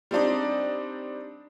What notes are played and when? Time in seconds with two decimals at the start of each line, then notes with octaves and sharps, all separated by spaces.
0.11 G3 C4 D4 D#4